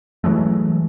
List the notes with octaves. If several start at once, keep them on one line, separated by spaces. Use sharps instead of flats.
E3 F#3 G#3 A3